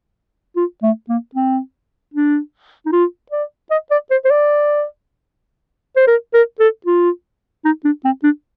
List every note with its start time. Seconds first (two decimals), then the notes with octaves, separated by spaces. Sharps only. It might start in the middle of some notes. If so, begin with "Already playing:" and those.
0.56 F4
0.83 A3
1.09 A#3
1.35 C4
2.14 D4
2.86 D#4
2.92 F4
3.32 D5
3.71 D#5
3.91 D5
4.11 C5
4.25 C5
4.30 D5
5.96 C5
6.08 A#4
6.34 A#4
6.60 A4
6.86 F4
7.65 D#4
7.85 D4
8.05 C4
8.24 D4